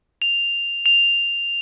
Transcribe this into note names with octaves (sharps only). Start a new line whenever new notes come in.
F7
F7